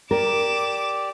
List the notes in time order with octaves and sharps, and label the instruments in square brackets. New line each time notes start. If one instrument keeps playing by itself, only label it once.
[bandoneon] G4 D5 [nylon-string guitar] A#4 [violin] D6 E7